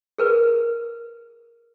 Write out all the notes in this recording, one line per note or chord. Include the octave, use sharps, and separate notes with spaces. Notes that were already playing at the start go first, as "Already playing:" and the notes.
G#4 A#4 B4